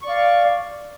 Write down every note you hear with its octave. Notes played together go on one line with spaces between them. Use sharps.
D5 F5 C#6